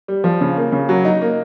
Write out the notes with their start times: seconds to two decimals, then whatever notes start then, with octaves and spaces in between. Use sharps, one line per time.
0.08 G3
0.24 F3
0.41 C#3
0.57 A#3
0.72 C#3
0.89 F#3
1.05 D#4
1.22 A#3